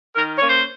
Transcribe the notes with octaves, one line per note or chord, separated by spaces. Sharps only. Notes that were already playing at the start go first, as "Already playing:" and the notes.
D#3 A#4
A#3 C#4 C#5
C5